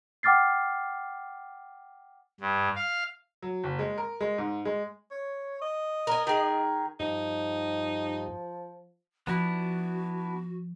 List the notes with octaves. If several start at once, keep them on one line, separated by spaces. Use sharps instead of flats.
F#5 G5 D6 F6 A6 C7
G2
F5
F#3
F#1
G#3
A#4
G#3
G#2
G#3
C#5
D#5
A#4 G#5
D#3 G#4
G2 F3 D#4 G4
F3 B3 D4 E4 F#4